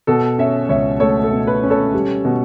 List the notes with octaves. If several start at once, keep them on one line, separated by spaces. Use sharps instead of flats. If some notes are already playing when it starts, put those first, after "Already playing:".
B2 A4
C#4 C#5 E5
C#2 C#5 E5
A3 A4 C#5
A4
B2
B4
C#4
A4 C#5
G3
B2